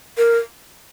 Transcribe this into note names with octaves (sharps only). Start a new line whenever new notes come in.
A#4